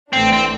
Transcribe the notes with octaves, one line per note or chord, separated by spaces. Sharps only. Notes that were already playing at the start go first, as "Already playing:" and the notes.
A1 A2 E3 A3 C4 D4
C4